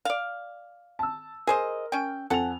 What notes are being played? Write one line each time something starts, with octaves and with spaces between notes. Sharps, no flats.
D5 F5
A5 E6
G#4 A#4 C5 D#5
C#4 G5
F2 A4 F#5 G#5 F7